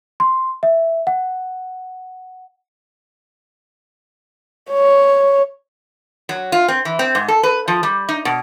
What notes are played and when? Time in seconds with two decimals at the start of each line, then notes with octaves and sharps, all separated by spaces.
0.20 C6
0.63 E5
1.07 F#5
4.71 C#5
6.29 F#3
6.52 F4
6.68 C4
6.85 E3
6.99 C4
7.15 G#2
7.28 A4
7.43 B4
7.68 F3
7.83 G3
8.09 D#4
8.25 B2